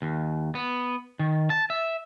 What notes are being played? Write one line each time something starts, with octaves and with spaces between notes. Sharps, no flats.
D#2
B3
D#3
A5
E5